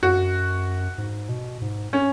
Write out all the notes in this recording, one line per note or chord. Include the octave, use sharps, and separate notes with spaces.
F#2 F#4
G#2
B2
G#2
C#4